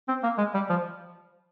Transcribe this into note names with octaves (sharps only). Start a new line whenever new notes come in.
C4
A#3
G#3
G3
F3